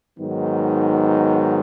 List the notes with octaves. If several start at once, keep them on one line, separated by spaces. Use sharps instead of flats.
G#2 D#3 F#3 B3